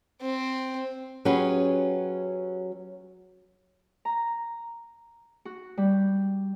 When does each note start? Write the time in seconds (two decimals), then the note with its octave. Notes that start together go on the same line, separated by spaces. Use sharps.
0.21 C4
1.25 F#3 C#4 G4 G#4 B4
4.05 A#5
5.45 F#4
5.77 G3